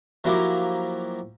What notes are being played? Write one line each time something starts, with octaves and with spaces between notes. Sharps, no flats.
F3 F#3 A#3 E4 G4 A#4